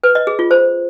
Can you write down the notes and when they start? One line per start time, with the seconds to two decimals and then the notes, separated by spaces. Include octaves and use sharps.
0.03 B4
0.15 D#5
0.27 G#4
0.39 F4
0.51 C5